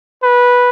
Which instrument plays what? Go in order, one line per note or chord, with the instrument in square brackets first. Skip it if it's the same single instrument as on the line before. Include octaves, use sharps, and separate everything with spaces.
[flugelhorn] B4